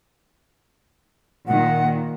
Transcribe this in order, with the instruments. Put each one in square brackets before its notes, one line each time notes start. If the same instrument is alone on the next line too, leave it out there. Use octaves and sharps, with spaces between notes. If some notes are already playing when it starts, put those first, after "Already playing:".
[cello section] A#2 D#3 [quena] F#5